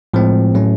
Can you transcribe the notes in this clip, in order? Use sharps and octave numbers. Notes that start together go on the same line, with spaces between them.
A2 F3 G#3 C4
A2 F#3 A3 C#4